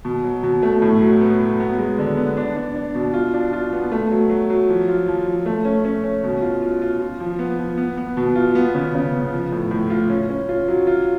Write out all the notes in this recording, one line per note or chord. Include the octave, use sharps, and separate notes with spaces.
B2
F#3
B2
A3
A2
F#3
B3
F#3
B3
G#3
D3
B3
D4
D4
D4
B2
F4
D4
F4
B3
A3
F#3
F#3
F#3
F3
F4
F3
F3
A3
C#4
C#4
C#4
B2
F4
F4
F4
F4
F3
B3
F3
B3
B3
B2
F4
B3
C#3
C#3
B3
F3
A2
A2
F4
C#4
C#4
F4
F#3
F4